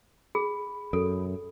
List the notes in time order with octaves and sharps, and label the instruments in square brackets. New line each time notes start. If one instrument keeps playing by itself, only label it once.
[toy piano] G#4 [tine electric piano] B5
[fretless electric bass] F#2 [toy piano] A4